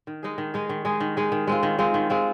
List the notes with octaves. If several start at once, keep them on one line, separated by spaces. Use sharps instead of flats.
D#3
G#3 D#4 G#4
D#3
G#3 D#4 G#4
D#3
G#3 D#4 G#4
D#3
G#3 D#4 G#4
D#3
G#3 C4 F4
D#3
G#3 C4 F4
D#3
G#3 C4 F4